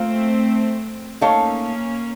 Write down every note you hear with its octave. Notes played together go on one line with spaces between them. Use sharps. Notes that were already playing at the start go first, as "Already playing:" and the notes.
Already playing: A3 A#3 C4 F4 C5 F5
A3 A#3 C#4 D#4 A4 C#5 F5